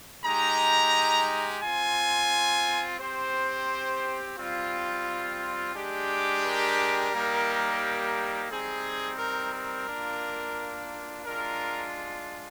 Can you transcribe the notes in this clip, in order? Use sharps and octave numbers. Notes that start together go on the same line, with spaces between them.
G#3 D#4 G4 A#5
C4 F4 G#5
C4 G4 C5
G3 C4 F4
G#3 D4 G4
A#4
G3 A#3 D#4 G4
G3 C4 D#4 G#4
A#4
A#4
A#3 D4 F4
G#3 D4 F4 A#4